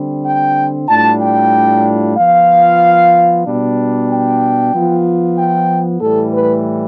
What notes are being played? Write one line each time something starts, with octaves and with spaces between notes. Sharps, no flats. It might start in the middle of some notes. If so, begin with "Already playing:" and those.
Already playing: D3 G3 C4
G5
A2 G3 D4 F4 A5
G5
F3 B3 F4 F5
B2 G3 D4
G5
F3 B3 F4
G5
A2 E3 G3 A4
B4